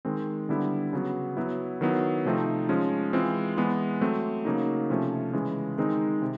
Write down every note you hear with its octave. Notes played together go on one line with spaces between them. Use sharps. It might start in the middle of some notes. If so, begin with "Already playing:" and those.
D#3 G#3 C4
D3 G3 B3 E4
C#3 F#3 B3
F#3 B3 E4
D#3 F#3 B3 E4
C3 F3 A3 C4 D#4
F3 G#3 C#4
E3 G#3 C4 F4
E3 G#3 B3
F#3 A3 C4
C#3 F#3 A#3 D#4
C3 F3 A3 C#4
C#3 E3 G#3
D#3 G#3 C4 D#4
C3